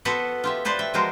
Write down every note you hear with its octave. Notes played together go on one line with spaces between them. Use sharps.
B3 F#4 A4 B4 C5 F#5
F4 G4 E5
A4 B4 C5 D5 A5
E5 G5
F3 G#3 B3 F#4 A#4 C5